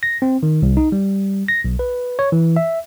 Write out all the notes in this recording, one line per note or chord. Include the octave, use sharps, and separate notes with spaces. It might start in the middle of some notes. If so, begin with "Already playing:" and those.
A#6
C4
D#3
C2
D#4
G3
A#6
B1
B4
C#5
E3
E5